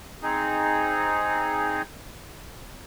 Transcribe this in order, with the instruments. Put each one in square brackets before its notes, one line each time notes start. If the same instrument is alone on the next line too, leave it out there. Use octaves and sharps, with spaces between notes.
[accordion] C4 D#4 G#4